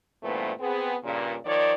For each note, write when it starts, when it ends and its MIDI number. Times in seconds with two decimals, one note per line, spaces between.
0.22 0.51 43
0.22 0.51 46
0.22 0.51 52
0.22 0.51 57
0.22 0.51 59
0.22 0.51 72
0.60 0.95 59
0.60 0.95 60
0.60 0.95 68
1.03 1.36 43
1.03 1.36 46
1.03 1.36 49
1.45 1.74 51
1.45 1.74 53
1.45 1.74 73
1.45 1.74 74